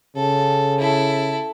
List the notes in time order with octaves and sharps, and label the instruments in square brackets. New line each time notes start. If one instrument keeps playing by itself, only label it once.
[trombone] C#3 [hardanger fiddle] A4
[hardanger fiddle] E4 A4